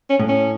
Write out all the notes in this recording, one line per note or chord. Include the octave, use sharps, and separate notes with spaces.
C#4
A2
C#4